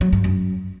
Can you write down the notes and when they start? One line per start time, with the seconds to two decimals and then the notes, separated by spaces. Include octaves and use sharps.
0.01 F#3
0.13 G2
0.24 F#2